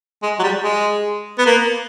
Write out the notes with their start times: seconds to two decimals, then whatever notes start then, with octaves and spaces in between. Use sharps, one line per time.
0.23 G#3
0.39 F#3
0.43 G3
0.64 G#3
1.38 B3
1.46 A#3